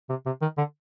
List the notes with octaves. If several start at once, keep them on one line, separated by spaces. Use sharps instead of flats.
C3
C3
D#3
D3